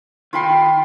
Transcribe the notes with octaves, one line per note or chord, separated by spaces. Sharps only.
D#3 F4 G5 B5 C6